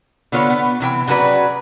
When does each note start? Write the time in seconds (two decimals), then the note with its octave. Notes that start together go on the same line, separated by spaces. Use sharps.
0.32 D3 B3 F4 C#5
0.50 B3
0.80 C3 E3 G5
1.07 C#3 F#3 F#4 B4 D5